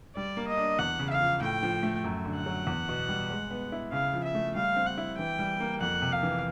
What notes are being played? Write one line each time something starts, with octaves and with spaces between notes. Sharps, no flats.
G3 D5
A#3
D#5
D4
E2 F#5
C#3
F5
F3
A2 G5
F3
A3
F#2
D3
F#5
F#3
E2
B2
G3
G#3
B3
E4
C#3 F5
F3
E5
A3
G3 F5
C4
F#5
E4
E3 G5
G3
A#3
F2 F#5
C3
F5
E3